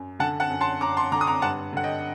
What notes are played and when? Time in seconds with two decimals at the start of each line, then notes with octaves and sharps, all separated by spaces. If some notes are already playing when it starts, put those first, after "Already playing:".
Already playing: F#2
0.19 D3 F#5 A5
0.40 F#5 A5
0.50 F#2
0.61 A5 C6
0.81 F#2 A#5 D6
0.97 A5 C6
1.12 D3 A#5 D6
1.21 D#6
1.27 A#5 D6
1.42 G2 F#5 A5
1.73 D3 F#5
1.84 D#5 G5